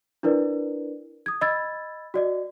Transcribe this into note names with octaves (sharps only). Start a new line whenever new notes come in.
D4 E4 A#4 B4 D5
D#6 G#6
D#5 B5 E6 G#6 A6
F#4 D5 D#5